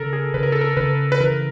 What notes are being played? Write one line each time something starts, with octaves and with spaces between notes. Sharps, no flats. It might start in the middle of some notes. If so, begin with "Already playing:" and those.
Already playing: C#3 A4 A#4
G#4
C#3 B4
A#4
A4
A#4
C#3 B4
B4
E3 A#4